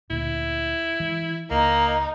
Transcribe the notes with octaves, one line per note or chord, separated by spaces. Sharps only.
D2 A#2 E4
E3 G#3
C#2 A#3 D#4